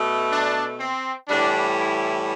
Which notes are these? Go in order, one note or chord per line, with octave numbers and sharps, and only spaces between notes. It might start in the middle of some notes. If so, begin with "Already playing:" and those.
Already playing: B2 A3
D4
C4
A2 E3 G3 D4
E4